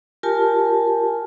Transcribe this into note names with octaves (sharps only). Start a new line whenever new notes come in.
F4 G4 A#4 G#5 A5